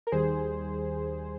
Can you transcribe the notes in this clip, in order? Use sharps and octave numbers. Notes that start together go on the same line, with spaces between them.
A#4
D#2 D#3 G3 G#4 C5